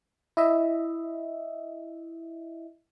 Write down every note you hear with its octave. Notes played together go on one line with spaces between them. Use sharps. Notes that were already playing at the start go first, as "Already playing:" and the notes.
E4 D#5 E5